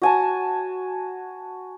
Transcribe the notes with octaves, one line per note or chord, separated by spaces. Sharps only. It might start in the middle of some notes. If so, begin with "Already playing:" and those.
F#4 G#5 A5